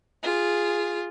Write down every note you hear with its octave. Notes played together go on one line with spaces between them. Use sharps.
F4 G#4